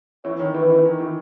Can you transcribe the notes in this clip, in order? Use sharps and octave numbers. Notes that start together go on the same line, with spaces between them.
E3 C#5
D#3
E3 B4
E3
D#3
E3